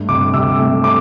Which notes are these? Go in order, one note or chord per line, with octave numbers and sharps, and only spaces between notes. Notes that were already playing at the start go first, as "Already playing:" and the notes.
Already playing: G2 A3
C3 D6
C3 E6
A3
C4 D6